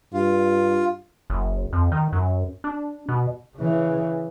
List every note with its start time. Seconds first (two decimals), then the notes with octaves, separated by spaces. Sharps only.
0.14 G2 F4
1.30 F#1
1.73 F2
1.92 D#3
2.13 F#2
2.64 D4
3.09 B2
3.56 C#3 E3